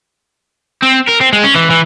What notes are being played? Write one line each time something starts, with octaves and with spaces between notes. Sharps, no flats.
C4
A#4
C4
G#3
C#4
E3
E3